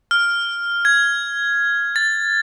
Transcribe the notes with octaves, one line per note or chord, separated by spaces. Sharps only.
F6
G#6
A6